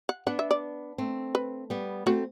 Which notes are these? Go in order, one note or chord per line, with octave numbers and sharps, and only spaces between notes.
F#5
B3 D4 F#5
E5
D5
A3 C4
B4
G3 B3
A3 C4 F#4